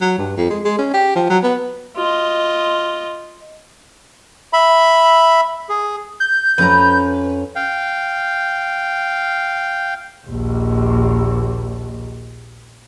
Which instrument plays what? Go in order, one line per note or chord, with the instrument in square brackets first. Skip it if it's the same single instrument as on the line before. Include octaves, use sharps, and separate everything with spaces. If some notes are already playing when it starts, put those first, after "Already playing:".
[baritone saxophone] F#3
G2
F2
G#3
G#3
C#4
G4
F3
F#3
B3
[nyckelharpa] F4 D#5
[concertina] E5 B5
G#4
[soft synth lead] G6
[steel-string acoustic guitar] F2 C#4 A#5 [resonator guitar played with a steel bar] B4
[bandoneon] F5 G5
[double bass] A#1 D#2